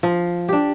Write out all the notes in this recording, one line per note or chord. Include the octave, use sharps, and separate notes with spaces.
F3
D4 G4